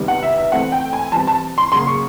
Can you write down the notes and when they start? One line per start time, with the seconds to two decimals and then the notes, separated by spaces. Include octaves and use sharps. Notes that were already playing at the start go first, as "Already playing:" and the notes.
Already playing: C3 D#3 G3 B3
0.08 F#5
0.23 E5
0.38 E5
0.52 E3 A3 C4 F#5
0.72 G5
0.93 G#5
1.12 E3 G3 C4 A5
1.27 A5
1.58 C6
1.72 C#3 F#3 A#3 C6
1.87 C#6